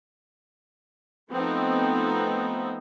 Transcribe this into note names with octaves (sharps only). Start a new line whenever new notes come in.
F3 A3 B3 C4 D#4